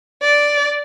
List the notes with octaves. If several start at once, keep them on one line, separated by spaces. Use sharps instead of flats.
D5